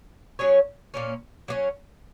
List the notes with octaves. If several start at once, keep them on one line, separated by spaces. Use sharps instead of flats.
F#3 C#4 G#4 C#5
A#2 A#3 C#4
F#3 A#3 C#4